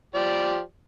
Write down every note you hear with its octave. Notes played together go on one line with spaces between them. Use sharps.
F3 G4 D5